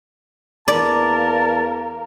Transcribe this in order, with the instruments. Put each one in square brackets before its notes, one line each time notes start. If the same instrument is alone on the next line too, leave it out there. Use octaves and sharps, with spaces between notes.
[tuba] E2 [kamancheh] A#3 A#4 [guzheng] D5 [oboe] A5